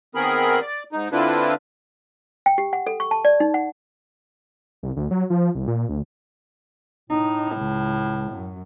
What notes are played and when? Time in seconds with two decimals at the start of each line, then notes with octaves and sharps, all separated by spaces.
0.15 D#3 B3 C4 G#4 A#4 B5
0.62 D5
0.92 G#2 D#4
1.12 D3 C4 D4 E4 F4 B4
2.46 G5
2.58 G4
2.73 F#5
2.87 A4
3.00 C#6
3.11 A5
3.25 D5
3.40 D#4
3.54 F#5
4.83 C2
4.96 D2
5.11 F#3
5.30 F3
5.55 C2
5.68 A#2
5.89 D2
7.10 A2 D#4
7.56 C#2
8.32 F#2